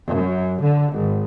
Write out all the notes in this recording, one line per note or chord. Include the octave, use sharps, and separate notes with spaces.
F#2
D3
G#1